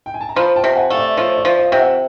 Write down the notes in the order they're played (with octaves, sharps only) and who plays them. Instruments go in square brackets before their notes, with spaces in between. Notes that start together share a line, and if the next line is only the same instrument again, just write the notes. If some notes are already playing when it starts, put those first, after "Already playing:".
[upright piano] G5
G#5
A5
A#5
[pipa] F3 [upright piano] A5 B5
[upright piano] G5 A5
[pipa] C3
[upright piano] F#5 G#5
[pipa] A3 [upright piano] F5
[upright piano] D5 E5
[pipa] F3 [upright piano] C#5 D#5
[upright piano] D5 E5
[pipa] F3
[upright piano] D#5 F5
[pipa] C3 [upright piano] G5
[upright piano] E5 F#5